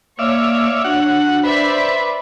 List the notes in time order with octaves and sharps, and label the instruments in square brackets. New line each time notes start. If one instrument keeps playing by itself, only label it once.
[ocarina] A#3 [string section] C#5 [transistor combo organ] D5 E5 F5
[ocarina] D4 [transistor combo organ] F#4 F#5
[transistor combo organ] B4 [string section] C5 D5 E5